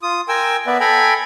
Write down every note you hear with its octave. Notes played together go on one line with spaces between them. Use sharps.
F4 D#6
A#4 G5 G#5 E6
B3 B4 D5 E5
A4 G5 G#5 A#5 B5